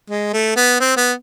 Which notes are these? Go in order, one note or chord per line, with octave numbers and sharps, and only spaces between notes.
G#3
A3
B3
C4
B3